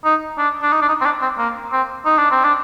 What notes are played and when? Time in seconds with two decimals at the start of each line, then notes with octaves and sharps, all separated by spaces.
0.05 D#4
0.38 D4
0.62 D4
0.72 D#4
0.82 D4
0.89 D#4
1.01 C4
1.05 D4
1.22 C4
1.38 A#3
1.72 C4
2.05 D#4
2.18 D4
2.31 C4
2.44 D4